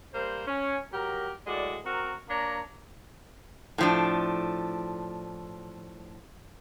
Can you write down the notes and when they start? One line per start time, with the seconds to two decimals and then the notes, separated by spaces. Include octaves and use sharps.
0.13 G3 A#3 C5
0.46 C#4
0.92 F#3 G4 A#4
1.45 A2 G#3 F#4 D5
1.85 C4 F#4 A#4
2.29 A#3 D4 C#5 A#5
3.78 A2 F3 D4